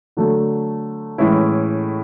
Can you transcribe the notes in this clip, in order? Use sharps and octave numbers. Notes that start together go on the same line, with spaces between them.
D3 F#3 A3
A2 E3 G#3 C#4 E4